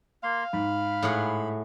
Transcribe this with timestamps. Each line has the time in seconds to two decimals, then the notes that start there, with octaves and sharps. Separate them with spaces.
0.23 A#3 F5 C6
0.53 G#2 B5
1.03 A2 G#4 F#5